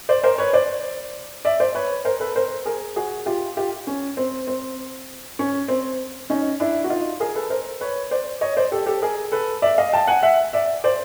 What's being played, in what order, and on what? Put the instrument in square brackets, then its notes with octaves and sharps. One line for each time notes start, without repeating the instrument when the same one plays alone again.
[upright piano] C5 D5
A#4 C5
B4 C#5
C5 D5
D5 E5
C5 D5
B4 C#5
A#4 C5
A4 B4
A#4 C5
G#4 A#4
F#4 G#4
F4 G4
F4 G4
C#4
C4
C4
C#4
C4
C#4 D#4
D4 E4
F#4
D#4 F4
G#4 A#4
A4 B4
A#4 C5
B4 C#5
C5 D5
C#5 D#5
C5 D5
G4 A4
G4 A4
G#4 A#4
A4 B4
D5 E5
D#5 F5
G5 A5
F#5 G#5
E5 F#5
D5 E5
C5 D5